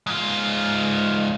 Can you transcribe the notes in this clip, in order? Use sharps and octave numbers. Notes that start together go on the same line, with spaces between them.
G#2 F4